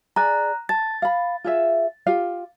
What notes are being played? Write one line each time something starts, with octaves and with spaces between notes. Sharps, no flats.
G#4 D5 G#5 A#5 F#6
A5 A6
F5 B5
F4 G#4 E5
F4 G4 F5